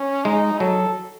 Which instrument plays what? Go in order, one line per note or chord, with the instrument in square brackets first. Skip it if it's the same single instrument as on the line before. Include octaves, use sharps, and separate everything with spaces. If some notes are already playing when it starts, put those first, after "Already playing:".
Already playing: [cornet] C#4
[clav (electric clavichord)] G#3 [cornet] D#4
[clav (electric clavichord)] F#3 [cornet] A4